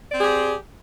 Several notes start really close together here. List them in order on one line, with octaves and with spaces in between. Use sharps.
D5 C4 G#4 G4